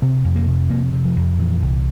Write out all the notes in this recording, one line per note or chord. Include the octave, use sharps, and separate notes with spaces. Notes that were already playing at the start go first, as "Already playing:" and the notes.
C3 C4
F2
A#3
C3
F2 A#3
C3
F3
F2
A#2 E3
C2